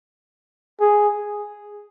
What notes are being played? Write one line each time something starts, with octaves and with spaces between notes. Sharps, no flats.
G#4